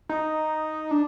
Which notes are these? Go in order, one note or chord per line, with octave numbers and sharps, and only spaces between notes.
D#4
D4